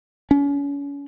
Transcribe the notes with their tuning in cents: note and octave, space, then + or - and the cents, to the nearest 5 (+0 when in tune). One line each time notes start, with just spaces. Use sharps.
C#4 +35